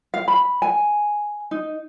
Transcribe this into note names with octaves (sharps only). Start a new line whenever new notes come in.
F5
B5
G#5
D#4